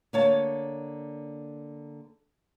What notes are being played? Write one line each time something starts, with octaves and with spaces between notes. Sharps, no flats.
D3 A#3 C#5 F5 A5